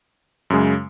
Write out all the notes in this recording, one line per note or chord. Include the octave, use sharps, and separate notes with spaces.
F#2 C#3 G#3